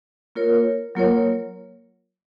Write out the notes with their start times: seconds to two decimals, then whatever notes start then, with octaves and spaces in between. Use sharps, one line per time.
0.36 A#3 F4 A#4 C#5
0.95 F#3 A#3 F4 A#4 C#5